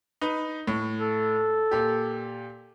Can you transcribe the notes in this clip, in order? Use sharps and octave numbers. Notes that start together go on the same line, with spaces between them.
D#4 B4
A2
A4
A#2 G4